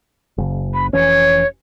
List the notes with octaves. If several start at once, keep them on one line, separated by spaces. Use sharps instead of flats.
F#1 C#3
B5
F1 E3 C#4 C#5